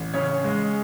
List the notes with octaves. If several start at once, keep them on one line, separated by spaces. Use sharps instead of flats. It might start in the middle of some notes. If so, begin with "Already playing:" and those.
Already playing: A1
C#3 C#5
G#3